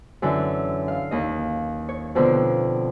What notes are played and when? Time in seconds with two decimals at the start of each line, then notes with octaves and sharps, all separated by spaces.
0.22 F#2 D3 E3
0.88 F5
1.11 D#2 D#5
1.89 C#5
2.15 F2 B2 D3 F3